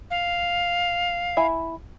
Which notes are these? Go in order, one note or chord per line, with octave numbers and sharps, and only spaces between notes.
F5
E4 E5 G#5